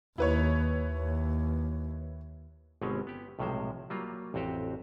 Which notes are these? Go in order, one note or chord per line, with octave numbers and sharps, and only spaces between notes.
D#2 E4 B4 C#5
D#2
G1 B2 G#3 C4 C#4
B3 G4
B1 A2 C3 F3 G#3 C5
F#3 G3 A#3 F4
A1 F2 C4 F#4 G4